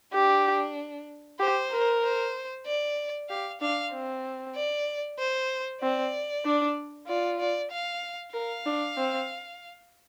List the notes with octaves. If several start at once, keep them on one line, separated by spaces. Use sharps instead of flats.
D4 G4
G4 C5
A#4
C5
D5
G4 F5
D4 F5
C4
D5
C5
C4 D5
D4
F4 D5
D5
F5
A#4 F5
D4
C4